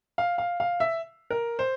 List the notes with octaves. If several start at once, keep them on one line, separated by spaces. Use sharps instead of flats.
F5
F5
F5
E5
A#4
C5